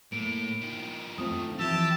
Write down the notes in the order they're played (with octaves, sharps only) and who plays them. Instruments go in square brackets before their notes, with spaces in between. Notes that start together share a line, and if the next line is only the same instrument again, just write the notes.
[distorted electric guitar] A2 [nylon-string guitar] A#3 [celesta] D7
[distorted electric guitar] D#3 F3
[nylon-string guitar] A3 C4 F4 [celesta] D#6
[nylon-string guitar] E3 F3 [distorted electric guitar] G4 [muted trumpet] A5 [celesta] E6